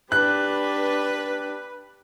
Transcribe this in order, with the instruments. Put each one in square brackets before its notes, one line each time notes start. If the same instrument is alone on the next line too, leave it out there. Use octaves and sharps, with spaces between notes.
[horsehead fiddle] D4 G4 [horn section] B4 [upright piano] F#6